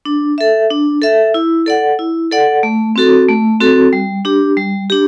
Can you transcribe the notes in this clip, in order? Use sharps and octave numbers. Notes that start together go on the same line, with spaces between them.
D4
A4 E5
D4
A4 E5
E4
A4 D5 F#5
E4
A4 D5 F#5
A3
C4 F#4 A4
A3
C4 F#4 A4
G3
D4 G4
G3
D4 G4